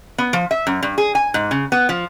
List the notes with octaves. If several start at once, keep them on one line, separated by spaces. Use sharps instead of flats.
B3
F3
E5
F#2
G2
G#4
G#5
G#2
C#3
B3
F3